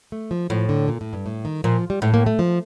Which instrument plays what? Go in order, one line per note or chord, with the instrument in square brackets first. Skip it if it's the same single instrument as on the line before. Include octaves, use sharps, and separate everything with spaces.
[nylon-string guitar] A3
F3
[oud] A2 [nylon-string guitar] F3
[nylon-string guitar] D3
A#2
A2
G2
A2
D#3
[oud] A#2 [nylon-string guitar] F3
[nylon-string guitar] G3
[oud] A2 [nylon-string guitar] A3
[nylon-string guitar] A#3
A3
F3